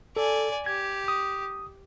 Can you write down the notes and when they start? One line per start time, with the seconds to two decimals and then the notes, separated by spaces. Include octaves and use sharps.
0.16 A4 D5 G#5
0.66 G4 G#6
1.08 D#6